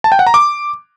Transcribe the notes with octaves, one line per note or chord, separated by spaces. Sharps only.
A5
G5
F#5
A#5
D6